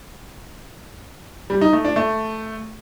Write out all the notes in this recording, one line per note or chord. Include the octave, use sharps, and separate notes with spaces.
G3
D#4
A3
D4
A3